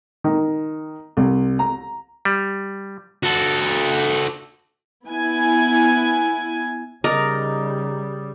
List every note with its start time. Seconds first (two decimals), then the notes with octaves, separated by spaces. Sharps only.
0.24 D#3
1.17 C2
1.59 A#5
2.25 G3
3.23 F#4 A4
5.06 B3 E4 G#5
7.04 C#3 G3 D#4 A#4 D6 D#6 A6